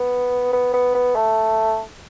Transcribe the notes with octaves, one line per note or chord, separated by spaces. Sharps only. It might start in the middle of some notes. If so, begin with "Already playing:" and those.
Already playing: B3
B3
B3
B3
A3